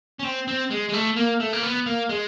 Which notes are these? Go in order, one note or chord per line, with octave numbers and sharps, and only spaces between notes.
C#4
C4
C4
G#3
G#3
A3
A#3
A3
A#3
B3
A#3
G#3